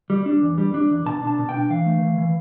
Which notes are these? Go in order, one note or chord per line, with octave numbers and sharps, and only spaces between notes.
G3
D4
E2
G3
D4
E2
B2 A5
D4
A5
B2
G5
D4
E3 F5
A3
E3
E3